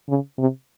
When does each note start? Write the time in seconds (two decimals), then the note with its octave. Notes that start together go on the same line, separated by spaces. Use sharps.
0.09 C#3
0.38 C3